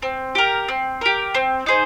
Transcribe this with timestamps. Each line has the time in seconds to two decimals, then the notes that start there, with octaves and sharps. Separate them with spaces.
0.02 C4
0.35 G4 A#4
0.69 C4
1.01 G4 A#4
1.35 C4
1.66 D#4 G#4 C5